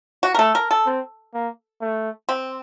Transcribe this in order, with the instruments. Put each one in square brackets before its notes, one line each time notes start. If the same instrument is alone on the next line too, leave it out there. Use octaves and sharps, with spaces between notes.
[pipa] F#4
A#4
[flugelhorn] A3 [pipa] A4
[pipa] A#4
A4
[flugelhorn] C4
A#3
A3
[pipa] C4